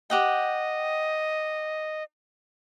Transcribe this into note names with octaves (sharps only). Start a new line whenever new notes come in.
G4 D#5 F#5 G5